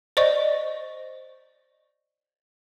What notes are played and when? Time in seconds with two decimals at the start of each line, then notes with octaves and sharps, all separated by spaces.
0.17 C5 D5 D#5 C#6